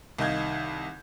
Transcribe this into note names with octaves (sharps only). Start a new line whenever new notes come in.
C2 D#3 D#5 F5 G6 G#6